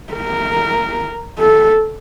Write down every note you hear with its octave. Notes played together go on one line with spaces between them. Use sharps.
A#4
A4